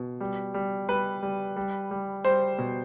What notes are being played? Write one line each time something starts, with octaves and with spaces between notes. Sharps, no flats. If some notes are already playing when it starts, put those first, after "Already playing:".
Already playing: B2
G3
G3
G3 B4
G3
G3
G3
G3 C5
B2